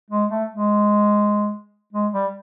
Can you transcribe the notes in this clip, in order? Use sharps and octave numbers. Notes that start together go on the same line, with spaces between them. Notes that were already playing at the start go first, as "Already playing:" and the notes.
G#3
A3
G#3
G#3
G3